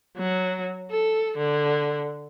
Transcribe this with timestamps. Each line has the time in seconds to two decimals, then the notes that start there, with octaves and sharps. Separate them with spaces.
0.18 F#3
0.91 A4
1.38 D3